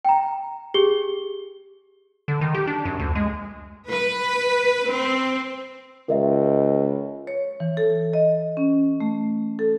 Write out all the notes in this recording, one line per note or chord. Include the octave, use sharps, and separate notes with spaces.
G5 A#5
G4 G#4 G7
D3
D#3
G4
D4
F#2
D2
G#3
B4
C4
C#2 A#4 D#5 E5
C#5
E3
A4
D#5
C#4
A3
A4